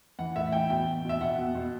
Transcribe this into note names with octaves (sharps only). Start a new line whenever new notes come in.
E3 F#5
A2 E5
E3 G5
B2 G5
B2
B2 E5
B2 F#5
B2
B2